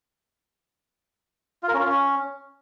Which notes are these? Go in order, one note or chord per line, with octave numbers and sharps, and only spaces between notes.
F4
A#4
C#4
F4
C#4